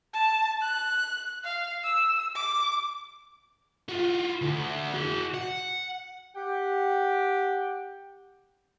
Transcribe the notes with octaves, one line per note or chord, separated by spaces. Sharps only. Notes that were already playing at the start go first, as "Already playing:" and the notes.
A5
F#6
F5
E6
D6
F4 F#4
D2
F#4 G#4
F#5
G4 F#5 G5